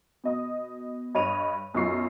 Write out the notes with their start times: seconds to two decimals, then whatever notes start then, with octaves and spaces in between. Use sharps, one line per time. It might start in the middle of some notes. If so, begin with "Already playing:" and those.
0.24 B2 D#5 D#6
1.15 G2 C#5 D#5 D#7 F7
1.74 B1 F#2 D#4 F4 C#6 C7